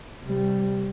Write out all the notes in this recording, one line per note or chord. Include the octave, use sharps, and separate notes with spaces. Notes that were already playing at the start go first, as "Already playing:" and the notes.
C3 G3